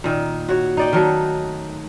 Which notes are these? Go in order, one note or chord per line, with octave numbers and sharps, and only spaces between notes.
A#2 D#3
F#4 C#5
D#4 D5 G5
D#3 F#3 A3